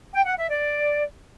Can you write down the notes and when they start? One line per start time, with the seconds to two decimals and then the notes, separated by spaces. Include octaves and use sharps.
0.14 G5
0.26 F#5
0.38 E5
0.50 D5